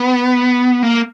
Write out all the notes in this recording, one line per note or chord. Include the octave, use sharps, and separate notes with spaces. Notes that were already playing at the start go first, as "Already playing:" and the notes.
Already playing: B3
A#3